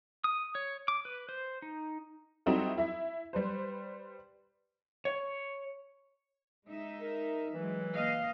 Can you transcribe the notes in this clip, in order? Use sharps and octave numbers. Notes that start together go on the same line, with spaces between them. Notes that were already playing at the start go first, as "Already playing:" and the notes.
D#6
C#5
D6
B4
C5
D#4
G3 C4 D#4 E4 F#4 A4
E4 E5
G3 B4 C5
C#5
G#3 D#4 E5
A#4
E3 F#3 G#3
A#3 D#5 F5